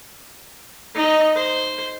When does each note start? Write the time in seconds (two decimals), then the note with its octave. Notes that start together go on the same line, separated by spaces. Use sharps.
0.95 D#4 D#5
1.35 C5